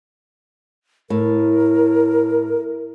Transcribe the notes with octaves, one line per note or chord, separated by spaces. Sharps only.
A2 A#4